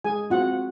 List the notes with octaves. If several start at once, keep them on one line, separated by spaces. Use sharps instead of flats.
G#3 G#4 G#5
C4 F4 F#4 F#5